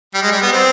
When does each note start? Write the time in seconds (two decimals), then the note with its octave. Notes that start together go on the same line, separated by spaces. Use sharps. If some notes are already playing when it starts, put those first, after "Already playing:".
0.14 G3
0.22 G#3
0.32 G3
0.42 B3
0.52 C4